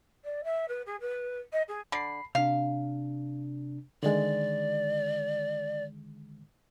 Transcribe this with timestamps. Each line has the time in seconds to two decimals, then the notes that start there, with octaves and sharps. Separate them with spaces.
0.25 D5
0.44 E5
0.69 B4
0.86 G#4
1.01 B4
1.53 D#5
1.68 G#4
1.92 D3 B5 C7
2.35 C3 D4 F5
4.03 D3 D#3 G#3 D5